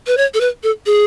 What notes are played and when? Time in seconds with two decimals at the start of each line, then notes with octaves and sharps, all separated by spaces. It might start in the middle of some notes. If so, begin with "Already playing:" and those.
0.07 B4
0.17 C#5
0.34 A4
0.41 B4
0.63 A4
0.86 G#4